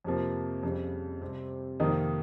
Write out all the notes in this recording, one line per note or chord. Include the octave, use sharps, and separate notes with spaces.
F2 C3 F3 A#3
F2 C#3 G3
C3 G3 C4 G4
F2 C3 D#3 A#3 D#4